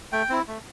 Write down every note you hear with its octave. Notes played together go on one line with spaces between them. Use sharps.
A3 G5
C4 E4
A3